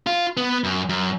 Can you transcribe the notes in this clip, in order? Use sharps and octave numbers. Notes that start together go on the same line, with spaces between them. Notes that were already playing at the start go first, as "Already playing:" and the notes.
F4
B3
F#2
F#2